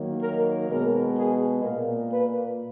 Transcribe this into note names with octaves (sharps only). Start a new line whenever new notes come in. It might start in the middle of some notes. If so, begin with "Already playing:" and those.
Already playing: D#3 F#3 A#3
A#4
B2 G#3 B3 A#4
G#4
A#2 A#3 A#4
B4